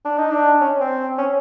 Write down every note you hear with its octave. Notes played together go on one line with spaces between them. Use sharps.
D4
D#4
D4
C#4
C4
C#4